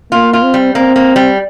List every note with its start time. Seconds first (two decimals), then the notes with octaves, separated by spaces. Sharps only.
0.12 A#3 F4
0.33 F4
0.43 C4
0.54 G3
0.75 A#3 C4
0.96 A#3
1.16 G3